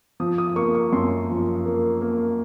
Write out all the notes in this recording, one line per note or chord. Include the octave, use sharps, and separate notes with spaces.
F3 D#6
D#6
A#3 C#6
C#6
F#2 C6
F3
A#3
A#3